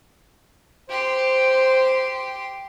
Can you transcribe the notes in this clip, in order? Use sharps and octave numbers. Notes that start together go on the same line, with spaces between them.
G4 C5 C6